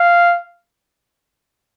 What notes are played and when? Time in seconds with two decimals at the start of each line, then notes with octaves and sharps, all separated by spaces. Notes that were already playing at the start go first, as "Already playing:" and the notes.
Already playing: F5